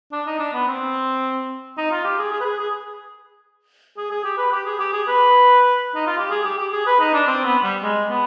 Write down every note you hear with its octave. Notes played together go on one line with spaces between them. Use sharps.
D4
D#4
D4
B3
C4
D#4
F4
G4
G#4
G#4
B4
G#4
G#4
G#4
G#4
G4
B4
G4
G#4
G4
G#4
B4
D#4
F4
G4
G#4
G4
G4
G#4
B4
D#4
D4
C4
B3
G3
G#3
B3